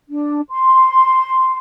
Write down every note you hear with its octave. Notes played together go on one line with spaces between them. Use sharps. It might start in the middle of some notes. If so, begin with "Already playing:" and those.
D4
C6